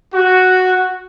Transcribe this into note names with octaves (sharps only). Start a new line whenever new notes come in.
F#4